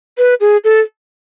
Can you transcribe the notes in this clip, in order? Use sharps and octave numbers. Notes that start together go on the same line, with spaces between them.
B4
G#4
A4